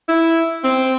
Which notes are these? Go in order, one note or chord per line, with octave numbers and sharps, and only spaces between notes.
E4
C4